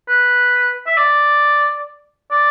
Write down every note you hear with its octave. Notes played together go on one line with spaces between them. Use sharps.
B4
E5
D5
D5